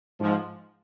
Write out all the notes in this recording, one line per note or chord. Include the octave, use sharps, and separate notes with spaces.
G#2 F3